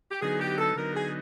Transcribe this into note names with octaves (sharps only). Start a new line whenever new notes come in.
G4
D3 F#3 B3 D#4 G#4
G4
A4
D3 F#3 B3 D#4 A#4
G#4